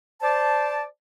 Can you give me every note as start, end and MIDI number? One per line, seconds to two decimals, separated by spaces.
0.22 0.84 72
0.22 0.84 74
0.22 0.84 81